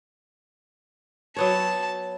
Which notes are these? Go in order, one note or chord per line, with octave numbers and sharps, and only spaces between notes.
F#3 B3 C#5 A5